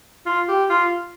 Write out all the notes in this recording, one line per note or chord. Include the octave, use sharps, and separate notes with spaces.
F4
G4
F4